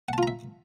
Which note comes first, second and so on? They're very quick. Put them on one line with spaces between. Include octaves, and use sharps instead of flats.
F#5 A5 F4 A#5 E5